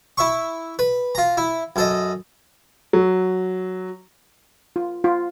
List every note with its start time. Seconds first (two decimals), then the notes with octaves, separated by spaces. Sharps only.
0.18 E4 E5 C#6
0.79 B4
1.15 F4 A#5
1.37 E4
1.76 F#2 A4 D#5
2.93 F#3
4.76 F4
5.04 F4